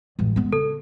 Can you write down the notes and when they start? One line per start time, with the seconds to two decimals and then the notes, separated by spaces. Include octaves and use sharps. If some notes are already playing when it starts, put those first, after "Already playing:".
0.19 A1 G#3
0.36 G#3 B3
0.53 C#3 A4